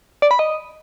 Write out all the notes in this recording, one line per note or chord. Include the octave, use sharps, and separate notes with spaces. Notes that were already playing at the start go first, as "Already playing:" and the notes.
D5
B5
D#5